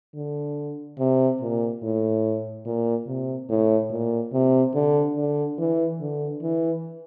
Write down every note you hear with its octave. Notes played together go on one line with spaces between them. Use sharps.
D3
C3
A#2
A2
A#2
C3
A2
A#2
C3
D3
D3
E3
D3
E3